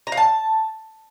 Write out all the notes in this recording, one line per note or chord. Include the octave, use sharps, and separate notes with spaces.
A#5
F5
A5